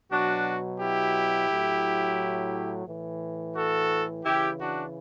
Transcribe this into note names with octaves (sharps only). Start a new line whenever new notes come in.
B2 F#3 D4 F#4
E4 G4
A2 F#3
A2 E3
F#4 A4
C#3 E3 E4 G4
D4 F#4